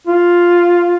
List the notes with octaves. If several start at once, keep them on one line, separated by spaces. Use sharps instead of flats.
F4